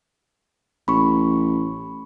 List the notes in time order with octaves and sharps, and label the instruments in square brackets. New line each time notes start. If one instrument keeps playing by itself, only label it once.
[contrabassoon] A1 [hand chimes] B5 C#6